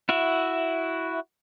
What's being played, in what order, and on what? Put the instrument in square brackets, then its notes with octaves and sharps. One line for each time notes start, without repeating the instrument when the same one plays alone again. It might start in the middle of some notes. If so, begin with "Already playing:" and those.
[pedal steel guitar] E4 F#4 E5